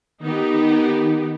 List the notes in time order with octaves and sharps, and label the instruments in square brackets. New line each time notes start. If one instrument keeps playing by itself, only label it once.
[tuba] D#3 [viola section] B3 D#4 G4